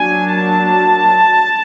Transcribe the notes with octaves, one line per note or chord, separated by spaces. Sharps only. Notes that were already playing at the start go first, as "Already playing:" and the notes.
Already playing: F#3 A#3 D4 G#5
A5